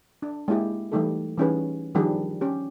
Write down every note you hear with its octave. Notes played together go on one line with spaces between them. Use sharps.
D4
G#3 A#3 E4 G4 G#4
E3 G3 A3 D#4 G4 A4
E3 G3 C#4 D#4 G#4 B4
D#3 F3 G3 D4 G#4
C#4 G4